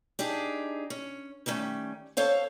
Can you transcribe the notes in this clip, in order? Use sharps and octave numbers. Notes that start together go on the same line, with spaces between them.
D4 D#4 G4 G#4
C#4
D#3 G3 A3 C#4
A4 C5 C#5 F5